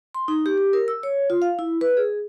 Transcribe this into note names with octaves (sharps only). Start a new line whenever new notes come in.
C6
D#4
G4
G4
A#4
E6
C#5
F4
F5
E4
B4
G#4